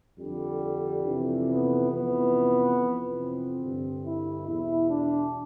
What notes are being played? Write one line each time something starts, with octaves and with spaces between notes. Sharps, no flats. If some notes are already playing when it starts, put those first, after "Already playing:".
F2 D3 G3
F2 C3 E3
B3
F2 C3 E3 B3
F2 C3 E3
C4
G2 D3
E4
E2 B2 E4
D4